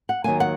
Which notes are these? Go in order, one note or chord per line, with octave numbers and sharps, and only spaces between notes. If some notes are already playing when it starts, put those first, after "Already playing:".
F#5
D#2 D#3 F#3 A#3 G#5
F#5